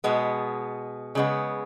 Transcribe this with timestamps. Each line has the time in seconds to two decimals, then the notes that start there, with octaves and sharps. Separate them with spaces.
0.04 B2 G#3 B3
1.15 C#3 G#3 B3